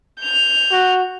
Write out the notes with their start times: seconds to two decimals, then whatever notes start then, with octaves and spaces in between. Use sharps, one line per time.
0.20 G6 F7
0.72 F#4